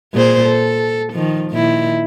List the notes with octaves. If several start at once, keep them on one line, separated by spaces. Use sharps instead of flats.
A#2 G#4 C5
A4
D#3 F3
A#2 D#3 E4